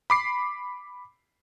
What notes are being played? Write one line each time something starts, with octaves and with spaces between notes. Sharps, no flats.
B5 D6 C7